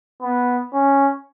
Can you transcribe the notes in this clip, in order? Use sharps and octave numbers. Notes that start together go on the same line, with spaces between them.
B3
C#4